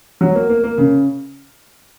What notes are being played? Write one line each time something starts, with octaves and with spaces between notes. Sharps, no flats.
F#3
A#3
A#3
A#3
C#3